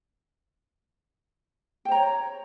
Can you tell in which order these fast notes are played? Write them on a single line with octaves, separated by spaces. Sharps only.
G5 C5 A#5 C#5